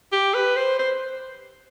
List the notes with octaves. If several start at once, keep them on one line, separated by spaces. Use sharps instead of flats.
G4
B4
C5
C5